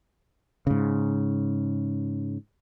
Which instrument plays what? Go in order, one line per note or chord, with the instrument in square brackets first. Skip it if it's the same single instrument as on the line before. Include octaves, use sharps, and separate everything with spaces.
[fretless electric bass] G#2 C#3